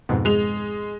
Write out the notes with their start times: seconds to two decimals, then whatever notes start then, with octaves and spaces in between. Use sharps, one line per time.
0.09 F2 G#2 B2
0.25 G#3 F7